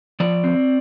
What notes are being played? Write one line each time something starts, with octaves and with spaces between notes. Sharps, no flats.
F3 D5
C4